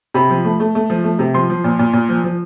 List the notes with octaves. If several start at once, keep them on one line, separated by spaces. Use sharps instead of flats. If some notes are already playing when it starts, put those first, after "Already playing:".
C3 B5
F3
A3
A3
A3
F3
A3
C3
F3 C6
F3
A#2
A#2
A#2
F3
F3